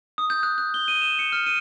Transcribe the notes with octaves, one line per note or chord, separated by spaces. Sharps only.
D#6
G6
F#6
F#6
G7
D#7
E7
C#7
F6
D#7